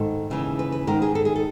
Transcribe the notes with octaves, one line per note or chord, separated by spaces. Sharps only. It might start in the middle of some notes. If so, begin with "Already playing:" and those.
Already playing: G#2 D#3 A4
D#2 C#3 E3
B4
B4
G#2 D#3 A#4
G#4
A4
G#4
A4